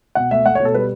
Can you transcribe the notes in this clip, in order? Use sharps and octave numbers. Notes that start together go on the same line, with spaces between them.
B2 F#5
A3 E5
A3 F#5
C#5
B2
A4
G3 B4